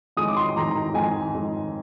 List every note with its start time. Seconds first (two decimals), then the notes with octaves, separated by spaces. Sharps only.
0.17 F2 D#3 G#3 D#6
0.28 D6
0.37 C6
0.56 F2 D#3 G#3 A#5
0.75 A#5
0.94 F2 D#3 G#3 G#5
1.33 F2 D#3 G#3